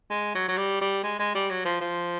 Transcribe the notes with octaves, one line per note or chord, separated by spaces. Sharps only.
G#3
F#3
F#3
G3
G3
G#3
G#3
G3
F#3
F3
F3